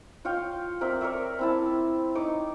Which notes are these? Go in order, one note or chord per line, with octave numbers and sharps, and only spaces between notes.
F4 C#5 F5 G5
C4 A#4 D5 E5
A#4 C#5 D5 E5
C4 E4 A5
D#4 C#5 D6